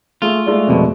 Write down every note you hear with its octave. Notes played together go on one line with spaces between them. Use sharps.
A3 F4 G#4
G#3 A3 D5
C2 F2 B2